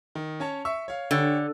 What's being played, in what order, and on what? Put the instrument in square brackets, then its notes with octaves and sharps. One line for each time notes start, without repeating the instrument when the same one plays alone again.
[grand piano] D#3
C#4 C#5 A5
E5 C#6 E6
C#5 F5
[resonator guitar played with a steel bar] D3 [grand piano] G4 C#5